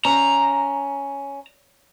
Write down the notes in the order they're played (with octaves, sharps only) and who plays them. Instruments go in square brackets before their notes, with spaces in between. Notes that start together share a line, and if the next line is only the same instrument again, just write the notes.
[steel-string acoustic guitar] C#4 [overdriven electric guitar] A#5